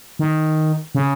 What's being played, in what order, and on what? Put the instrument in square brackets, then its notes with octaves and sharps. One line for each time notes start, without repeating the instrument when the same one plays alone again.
[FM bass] D#3
C#3